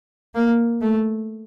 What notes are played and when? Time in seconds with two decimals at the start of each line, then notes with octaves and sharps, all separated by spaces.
0.35 A#3
0.81 A3